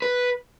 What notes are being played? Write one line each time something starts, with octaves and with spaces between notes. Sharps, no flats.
B4